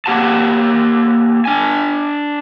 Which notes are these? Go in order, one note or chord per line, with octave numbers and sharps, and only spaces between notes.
A#3 G4 F#5 A5
D4 G#5